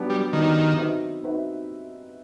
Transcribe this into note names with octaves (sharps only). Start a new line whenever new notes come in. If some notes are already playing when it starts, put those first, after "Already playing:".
Already playing: F#3 B3 D4 G4
G3
D#3 F#3 B3 D4 G4
C4 D#4 F#4 B4 E5
C4 D#4 F#4 B4 E5